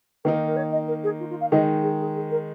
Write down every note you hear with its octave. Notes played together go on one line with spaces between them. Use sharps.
D#3 A#3 D#4 A#4
A#4
C#5
D#5
A#4
G#4
F4
F4
F5
D#3 G#3 D#4 D#5
G#4
G#4
G#4
A#4